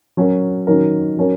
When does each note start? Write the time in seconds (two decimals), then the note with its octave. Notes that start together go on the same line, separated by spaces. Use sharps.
0.17 F#3 C#4 F#4 A#4
0.67 D#3 F#3 C#4 A#4
1.17 F#3 C#4 A#4